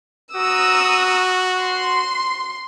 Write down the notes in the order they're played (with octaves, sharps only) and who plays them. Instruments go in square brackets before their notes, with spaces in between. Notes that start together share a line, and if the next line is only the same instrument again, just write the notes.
[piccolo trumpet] F#4 [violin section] A#5 D#6 E6
[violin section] C6